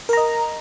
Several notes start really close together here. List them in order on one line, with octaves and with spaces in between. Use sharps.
A#4 A#5 D#5